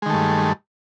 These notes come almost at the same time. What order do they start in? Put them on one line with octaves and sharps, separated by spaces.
G#3 D#3 A3 G2